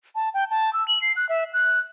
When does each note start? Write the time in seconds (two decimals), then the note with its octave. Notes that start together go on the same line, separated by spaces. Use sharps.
0.15 A5
0.34 G5
0.50 A5
0.73 E6
0.88 F#7
1.02 C7
1.16 F#6
1.29 E5
1.53 F#6